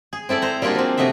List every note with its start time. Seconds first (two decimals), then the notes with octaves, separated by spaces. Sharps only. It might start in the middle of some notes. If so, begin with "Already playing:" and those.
0.13 G#4
0.29 C4 E4 A4 D5
0.42 C5 A#5
0.62 G3 A#3 D4 F4 F#4 G#4
0.75 F3 C4
0.97 C3 A3 F#4 D#5 E5